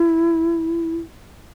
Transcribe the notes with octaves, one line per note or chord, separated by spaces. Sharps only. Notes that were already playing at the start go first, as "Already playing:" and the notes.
Already playing: E4